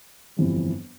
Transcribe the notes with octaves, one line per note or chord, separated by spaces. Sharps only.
G1 F2 E3 G3